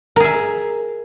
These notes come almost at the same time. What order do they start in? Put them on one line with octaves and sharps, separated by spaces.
A#4 G#4 E5